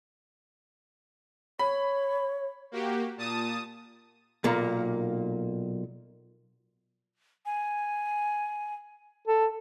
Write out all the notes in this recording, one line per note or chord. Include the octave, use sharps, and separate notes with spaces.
C#5 B5
A#3 F#4 G4
A#2 A5 D#6
B1 A#2 A#3
G#5
A4